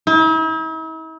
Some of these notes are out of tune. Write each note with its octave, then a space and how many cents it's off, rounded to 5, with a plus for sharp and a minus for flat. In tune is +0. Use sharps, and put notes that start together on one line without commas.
E4 -45